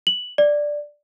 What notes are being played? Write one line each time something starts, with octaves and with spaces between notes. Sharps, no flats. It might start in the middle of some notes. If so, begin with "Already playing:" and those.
F#7
D5